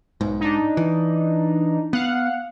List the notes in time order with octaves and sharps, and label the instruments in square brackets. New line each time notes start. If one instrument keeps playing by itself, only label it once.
[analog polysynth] B1 [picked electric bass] G#2
[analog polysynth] D4 D#4
[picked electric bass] E3
[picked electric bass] B3 [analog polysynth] F5 F#5